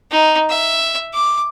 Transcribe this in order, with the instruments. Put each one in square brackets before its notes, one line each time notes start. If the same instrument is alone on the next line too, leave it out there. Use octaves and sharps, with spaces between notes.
[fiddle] D#4
E5
D6